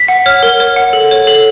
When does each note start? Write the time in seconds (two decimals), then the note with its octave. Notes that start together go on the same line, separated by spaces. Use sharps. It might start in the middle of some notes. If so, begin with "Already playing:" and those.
Already playing: B6
0.08 F#5
0.26 C#5 F6
0.43 A#4
0.60 C#5
0.76 F#5
0.93 A4
1.11 C#5
1.27 A4